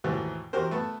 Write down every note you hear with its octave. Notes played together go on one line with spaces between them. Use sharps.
D#2 G#2 B2 E3 A3
E2 F#4 G4 A#4 C5
A3 B3 A5